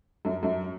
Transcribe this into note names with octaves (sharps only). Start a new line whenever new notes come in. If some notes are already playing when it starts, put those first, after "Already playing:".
F#2
F#2